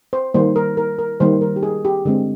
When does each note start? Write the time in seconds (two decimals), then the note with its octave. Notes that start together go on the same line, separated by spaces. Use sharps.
0.13 C5
0.34 D#3 G3 A#3 C5
0.56 A#4
0.77 A#4
0.99 A#4
1.20 D#3 G3 A#3 C5
1.41 A#4
1.56 G4
1.63 G#4
1.85 G4
2.05 D3 G#3 C4